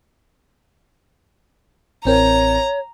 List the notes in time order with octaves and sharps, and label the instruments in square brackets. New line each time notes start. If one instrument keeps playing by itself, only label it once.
[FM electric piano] A1 C4 A#4 [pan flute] C#5 [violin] A#5